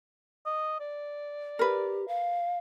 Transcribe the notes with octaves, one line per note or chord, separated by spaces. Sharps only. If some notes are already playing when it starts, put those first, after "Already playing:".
D#5
D5
G4 A#4 B4
F5